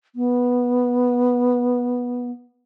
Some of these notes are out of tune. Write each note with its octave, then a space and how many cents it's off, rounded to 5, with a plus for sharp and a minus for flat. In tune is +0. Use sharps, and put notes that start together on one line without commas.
B3 -10